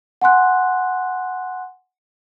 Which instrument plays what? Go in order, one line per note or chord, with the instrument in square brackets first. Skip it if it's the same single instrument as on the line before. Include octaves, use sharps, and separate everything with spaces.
[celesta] F#5 G#5 C6 F#6